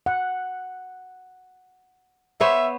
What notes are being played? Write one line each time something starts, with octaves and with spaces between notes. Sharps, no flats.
F#5
B3 C5 C#5 E5